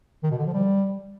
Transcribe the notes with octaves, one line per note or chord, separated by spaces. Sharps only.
D#3
B2
D3
F3
G3